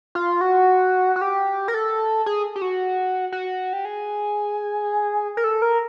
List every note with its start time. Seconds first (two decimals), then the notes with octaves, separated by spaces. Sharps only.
0.15 F4
0.41 F#4
1.16 F#4
1.21 G4
1.68 A#4
1.74 A4
2.26 G#4
2.56 G4
2.62 F#4
3.32 F#4
3.73 G4
3.85 G#4
5.37 A#4
5.44 A4
5.62 A#4